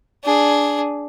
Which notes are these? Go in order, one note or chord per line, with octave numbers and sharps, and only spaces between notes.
D4 G#4